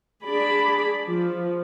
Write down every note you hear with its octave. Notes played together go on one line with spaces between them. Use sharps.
D4 G#4 D5 B5
F3